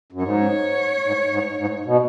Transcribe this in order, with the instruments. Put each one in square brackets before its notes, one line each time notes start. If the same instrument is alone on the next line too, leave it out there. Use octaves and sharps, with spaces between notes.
[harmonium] F#2
[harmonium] G#2 [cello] C#5
[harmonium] G#2
G#2
G#2
B2